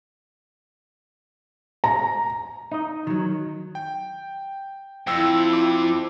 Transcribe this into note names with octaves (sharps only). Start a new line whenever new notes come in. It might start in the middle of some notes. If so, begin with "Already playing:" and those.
A#5
D#4 D#5
D#3 F#3
G5
F2 E4 G5 E6
D6